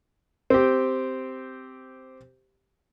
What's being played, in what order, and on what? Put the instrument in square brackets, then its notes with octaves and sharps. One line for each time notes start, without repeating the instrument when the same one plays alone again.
[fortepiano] C4 G4